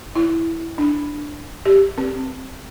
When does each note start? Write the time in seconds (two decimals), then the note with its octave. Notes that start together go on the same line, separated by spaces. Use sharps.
0.16 E4
0.78 D4
1.65 G4
1.98 C4